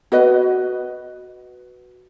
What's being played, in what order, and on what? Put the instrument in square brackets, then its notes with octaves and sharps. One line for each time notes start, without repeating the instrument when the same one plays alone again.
[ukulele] F#4 B4 D#5